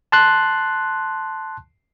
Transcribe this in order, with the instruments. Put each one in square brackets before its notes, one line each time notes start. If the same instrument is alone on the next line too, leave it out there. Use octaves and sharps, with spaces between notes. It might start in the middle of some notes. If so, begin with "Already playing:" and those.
[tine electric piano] A5 C6 F#6